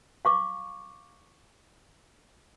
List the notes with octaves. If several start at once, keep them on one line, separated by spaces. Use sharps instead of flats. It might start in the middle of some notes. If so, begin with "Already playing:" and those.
F5 C#6 D6